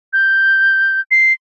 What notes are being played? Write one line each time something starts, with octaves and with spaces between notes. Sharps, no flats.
G6
C7